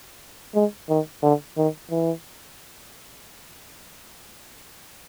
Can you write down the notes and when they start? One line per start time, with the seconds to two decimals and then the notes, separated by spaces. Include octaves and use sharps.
0.55 G#3
0.89 D#3
1.23 D3
1.57 D#3
1.91 E3